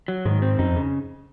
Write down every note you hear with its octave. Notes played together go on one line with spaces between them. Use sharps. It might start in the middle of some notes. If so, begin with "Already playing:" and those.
F#3
G#2 D#3
C4
F#2 D#4
F2
C#3